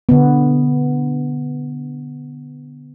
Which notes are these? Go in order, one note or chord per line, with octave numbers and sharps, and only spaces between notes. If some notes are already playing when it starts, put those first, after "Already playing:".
D3 B3